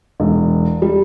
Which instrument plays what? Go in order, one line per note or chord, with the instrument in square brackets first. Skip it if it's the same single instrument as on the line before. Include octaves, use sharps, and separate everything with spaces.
[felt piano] E1
G3